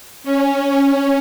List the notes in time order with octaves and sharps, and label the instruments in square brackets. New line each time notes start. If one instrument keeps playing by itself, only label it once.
[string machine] C#4